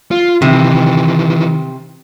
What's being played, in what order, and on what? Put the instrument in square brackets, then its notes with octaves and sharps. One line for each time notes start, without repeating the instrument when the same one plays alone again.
[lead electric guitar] F4
[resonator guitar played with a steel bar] C3 [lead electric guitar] D#3 E3